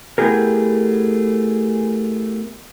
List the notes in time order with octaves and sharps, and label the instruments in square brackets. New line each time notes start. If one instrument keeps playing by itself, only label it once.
[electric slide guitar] A3 B3 E4 G4 G#4 A#4